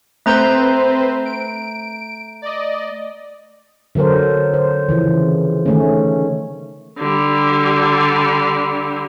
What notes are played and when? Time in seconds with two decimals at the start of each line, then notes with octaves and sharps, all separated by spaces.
0.26 A3 C4 B4 C5 A#5 G6
1.25 D7
2.42 D5 D#5
3.95 D3 F#3 A4 A#4 C5
4.54 C5
4.88 C#3 E3 F3
5.66 D#3 A3 C#4
6.98 D3 G3